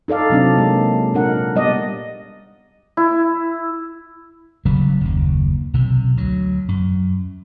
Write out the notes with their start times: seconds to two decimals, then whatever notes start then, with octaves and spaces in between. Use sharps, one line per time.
0.08 D#4 A4 D5 F5
0.30 C3 F#3 C4 D4
0.58 G#3 A#3
1.14 A#2 D4 A#4 F#5
1.56 G3 B3 D5 D#5
2.97 E4
4.65 D#1 C#3 F#3 G3
5.01 F#1 D#2
5.74 B1 C3
6.16 D2 F#3
6.69 F#2